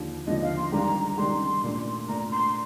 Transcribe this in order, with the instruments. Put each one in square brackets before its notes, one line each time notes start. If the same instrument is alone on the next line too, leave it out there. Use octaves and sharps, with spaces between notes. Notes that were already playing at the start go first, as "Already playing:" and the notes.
Already playing: [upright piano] D#2 D3 F3
[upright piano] D#2 D3 F3 [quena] D#5
[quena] F5
C6
[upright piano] D#3 G3 D4 G4 [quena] A#5
[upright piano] D#3 G3 D4 G4 [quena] C6
[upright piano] A#2 A3 D4
[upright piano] A#2 A3 D4 [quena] A#5
[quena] C6